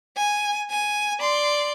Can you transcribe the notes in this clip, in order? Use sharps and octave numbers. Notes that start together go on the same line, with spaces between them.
G#5
G#5
D5 C6